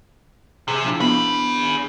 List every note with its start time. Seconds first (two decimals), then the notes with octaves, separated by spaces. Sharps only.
0.68 C3 G#4
0.83 F3 D4 E4
1.00 B3 G#4 B5